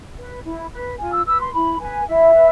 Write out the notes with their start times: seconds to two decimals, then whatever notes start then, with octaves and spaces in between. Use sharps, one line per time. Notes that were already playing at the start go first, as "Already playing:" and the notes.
0.18 B4
0.45 E4
0.72 B4
0.99 F4 G#5
1.13 E6
1.26 B4 E6
1.40 C6
1.53 E4 B5
1.81 B4 G#5
2.07 E4 E5
2.34 B4